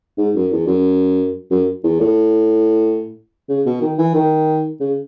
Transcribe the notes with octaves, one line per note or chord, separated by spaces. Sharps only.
G#2
F#2
E2
F#2
F#2
E2
A2
C#3
B2
D#3
E3
D#3
C#3